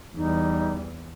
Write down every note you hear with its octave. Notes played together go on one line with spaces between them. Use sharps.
E2 E3 G3 D#4